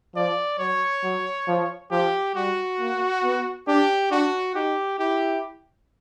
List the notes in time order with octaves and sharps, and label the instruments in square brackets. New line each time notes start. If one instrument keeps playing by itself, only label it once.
[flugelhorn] F3 [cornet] D5
[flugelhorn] F#3 [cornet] C#5
[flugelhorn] F#3
F3
[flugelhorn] F3 [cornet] G4
[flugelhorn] G3 [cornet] F#4
[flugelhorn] A#3
B3
[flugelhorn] D4 [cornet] G4
[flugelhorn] D4 [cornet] F#4
[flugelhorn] D#4 [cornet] G4
[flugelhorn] E4 [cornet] G4